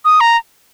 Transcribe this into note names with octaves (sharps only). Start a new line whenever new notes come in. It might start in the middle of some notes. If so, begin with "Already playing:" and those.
D#6
A#5